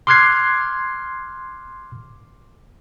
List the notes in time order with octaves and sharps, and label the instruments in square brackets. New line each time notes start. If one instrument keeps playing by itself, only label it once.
[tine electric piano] C6 D6 F6 F#6 G#6 C7